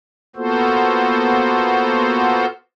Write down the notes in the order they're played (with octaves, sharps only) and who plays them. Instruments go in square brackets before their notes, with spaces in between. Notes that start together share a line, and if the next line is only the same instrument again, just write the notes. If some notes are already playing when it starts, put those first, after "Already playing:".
[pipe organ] A#3 B3 F4 F#4 A4 C5